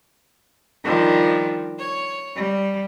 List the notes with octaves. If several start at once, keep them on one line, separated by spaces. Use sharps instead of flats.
D#3 F3 G3 D4
C#5
G3